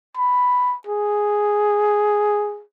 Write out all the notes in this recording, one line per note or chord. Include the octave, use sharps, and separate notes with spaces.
B5
G#4